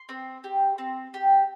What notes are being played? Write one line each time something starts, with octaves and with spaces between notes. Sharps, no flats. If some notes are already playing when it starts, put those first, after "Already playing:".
Already playing: C6
C4
G4
C4
G4